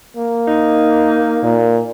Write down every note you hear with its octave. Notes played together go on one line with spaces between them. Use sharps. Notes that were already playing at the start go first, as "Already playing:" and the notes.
A#3
D#4
A#2